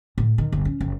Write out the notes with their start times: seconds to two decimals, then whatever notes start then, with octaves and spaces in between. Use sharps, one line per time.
0.18 A2
0.38 D#3
0.52 G1
0.65 C#4
0.81 F#1